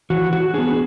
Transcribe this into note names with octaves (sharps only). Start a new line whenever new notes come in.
E3 F#4
F#4
B3 D4 G#4